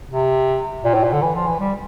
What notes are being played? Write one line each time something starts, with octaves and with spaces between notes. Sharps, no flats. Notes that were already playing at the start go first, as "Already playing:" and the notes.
C3
A#2
A2
A#2
D3
E3
F3
E3
G3